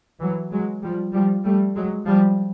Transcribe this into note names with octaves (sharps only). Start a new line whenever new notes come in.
E3 F#3
F#3 G#3
F3 G3
F3 G3
G3 A3
F#3 G#3
F3 G3